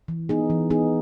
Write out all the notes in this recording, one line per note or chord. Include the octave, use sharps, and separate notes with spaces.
E3
B3 D#4 G#4
E3
B3 D#4 G#4